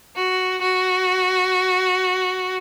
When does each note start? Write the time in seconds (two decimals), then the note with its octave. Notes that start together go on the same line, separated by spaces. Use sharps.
0.16 F#4
0.62 F#4